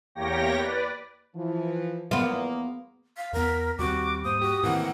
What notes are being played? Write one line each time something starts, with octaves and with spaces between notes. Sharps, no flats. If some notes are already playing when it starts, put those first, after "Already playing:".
E2 A#3 G4 C#5 G5 A#6
B4 D5
E3 F3
E2 A#3 B3 F4
F5 B6
E2 B3 A#4
D#2 G3 C4 F#4 D6
G#2 A#3 C5 D#6
F#4 G4
A2 D#3 E3 A#3 C4 F#5